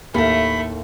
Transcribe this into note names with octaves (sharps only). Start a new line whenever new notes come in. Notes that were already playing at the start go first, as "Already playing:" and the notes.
D#2 A2 A3 A#4 B5